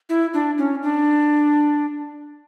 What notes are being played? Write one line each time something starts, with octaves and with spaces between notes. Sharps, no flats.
E4
D4
C#4
D4